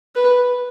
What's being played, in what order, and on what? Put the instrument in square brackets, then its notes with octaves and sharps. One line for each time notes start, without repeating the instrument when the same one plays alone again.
[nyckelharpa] B4